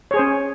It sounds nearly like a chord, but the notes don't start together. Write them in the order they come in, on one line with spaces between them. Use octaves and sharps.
C#5 G#4 C5 C#4